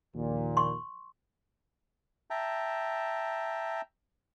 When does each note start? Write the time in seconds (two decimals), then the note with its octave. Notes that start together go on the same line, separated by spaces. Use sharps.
0.14 A#1 D#2 A#2
0.57 C6 C#6
2.30 E5 G5 A5 A#5